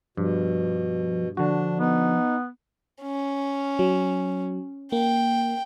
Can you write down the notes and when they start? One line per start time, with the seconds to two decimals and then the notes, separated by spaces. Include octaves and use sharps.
0.17 G2 B2 F3
1.37 D3 F3 D4 F#4
1.78 B3 D#4
3.02 C#4
3.79 F#3
4.92 A#3 G5